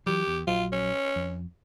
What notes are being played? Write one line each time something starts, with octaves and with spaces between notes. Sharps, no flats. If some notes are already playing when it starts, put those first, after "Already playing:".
E3 F#3 G4
E2
A#1 F#3 F4
C#4
F2